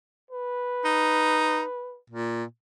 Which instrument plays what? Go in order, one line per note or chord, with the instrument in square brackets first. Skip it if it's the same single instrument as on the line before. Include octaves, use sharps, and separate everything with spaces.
[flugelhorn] B4
[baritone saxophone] D#4
A#2